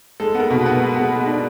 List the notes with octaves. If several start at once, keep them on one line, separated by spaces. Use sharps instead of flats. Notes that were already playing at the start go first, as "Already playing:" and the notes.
G#3 A4
B3 A#4
B2
B3 B4
G#3
B3
G#3
D4